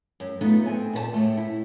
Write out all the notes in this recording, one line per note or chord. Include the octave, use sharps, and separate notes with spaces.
F#2
A3 B3 D#4 F4 A4 B4
C4 G#5
A#2 B4 A5
A2 A3
E4